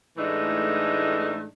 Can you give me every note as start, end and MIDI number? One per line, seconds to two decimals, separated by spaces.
0.17 1.47 45
0.17 1.47 52
0.17 1.47 56
0.17 1.47 57
0.17 1.47 62
0.17 1.47 63